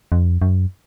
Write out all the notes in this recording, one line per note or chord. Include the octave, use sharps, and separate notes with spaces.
F2
F#2